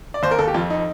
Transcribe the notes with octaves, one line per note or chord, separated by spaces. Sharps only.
D5
D#2 C5
A#4
D#2 A4
G4
F2 F4
D#4